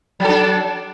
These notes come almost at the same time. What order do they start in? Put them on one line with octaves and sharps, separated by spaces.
F#3 A4 D4